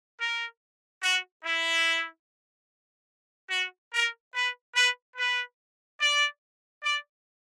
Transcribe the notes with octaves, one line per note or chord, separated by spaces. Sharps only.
A#4
F#4
E4
F#4
A#4
B4
B4
B4
D5
D5